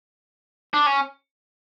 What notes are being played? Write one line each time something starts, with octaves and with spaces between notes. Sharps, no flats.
D4
C#4